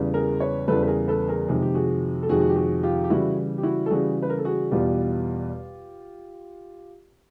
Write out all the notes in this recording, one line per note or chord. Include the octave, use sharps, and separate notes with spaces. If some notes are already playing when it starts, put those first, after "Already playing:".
Already playing: E2 C#3 E3 G3
G#4 A#4
B4 C#5
E2 C#3 E3 G3 A4 B4
B4
G#4 A#4
A4 B4
G#4 A#4
F2 C3 D#3 G#3 G#4
G4
F#4 G#4
A4
F2 C3 D#3 G#3 F#4 G#4
F#4
G4
F#4 G#4
F4 G4
G4
C#3 E3 G3 E4 F#4
G4
E4 F#4
A4
C#3 E3 G3 F#4 G#4
B4
A#4
A4
F#4 G#4
E2 B2 G3 B3 F4 G4